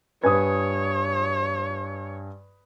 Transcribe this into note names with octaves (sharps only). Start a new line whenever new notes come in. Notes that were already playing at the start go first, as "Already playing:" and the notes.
G2 B4 C#5 G#5 D#6 G#6